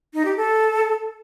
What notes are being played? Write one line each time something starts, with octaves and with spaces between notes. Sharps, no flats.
D#4
G4
A4